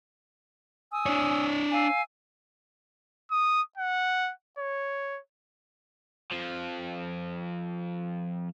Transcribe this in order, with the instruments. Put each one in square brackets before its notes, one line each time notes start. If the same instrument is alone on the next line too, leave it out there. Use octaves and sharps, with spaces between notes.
[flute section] G#5 D#6 E6
[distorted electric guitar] D4 C#5
[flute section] F5 G#5 E6
[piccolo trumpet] D#6
F#5
C#5
[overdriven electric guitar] F2 F3